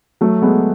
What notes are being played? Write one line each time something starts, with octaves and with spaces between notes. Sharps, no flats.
F#3 A3
G#3 B3